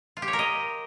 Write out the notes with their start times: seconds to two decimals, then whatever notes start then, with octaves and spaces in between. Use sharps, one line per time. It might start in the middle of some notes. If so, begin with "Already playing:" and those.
0.17 F4
0.22 G4
0.28 C#5
0.33 A#4
0.39 D#5